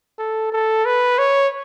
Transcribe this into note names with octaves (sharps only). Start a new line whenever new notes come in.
A4
A4
B4
C#5